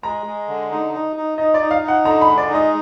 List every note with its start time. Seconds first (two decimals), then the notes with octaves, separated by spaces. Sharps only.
0.03 G#3 A#5
0.26 G#3
0.48 D3
0.71 D#4
0.93 D#4
1.16 D#4
1.38 D#4 D#5
1.54 D5
1.60 D#4
1.71 F5
1.83 D#4
1.88 F#5
2.05 D3 A#5
2.21 B5
2.27 G#3
2.38 D5
2.49 D#4
2.55 D#5